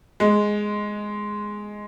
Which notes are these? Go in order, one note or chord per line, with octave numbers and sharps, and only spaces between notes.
G#3